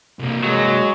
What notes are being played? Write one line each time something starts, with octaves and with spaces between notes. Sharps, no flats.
C2 A#3
F#3 G#3